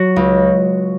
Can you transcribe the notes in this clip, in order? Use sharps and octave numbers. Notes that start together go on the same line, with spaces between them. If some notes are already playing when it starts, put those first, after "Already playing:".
Already playing: F#3 F#4
C#2